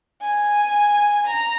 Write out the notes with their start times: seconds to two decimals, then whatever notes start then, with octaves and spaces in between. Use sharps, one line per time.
0.22 G#5
1.27 A#5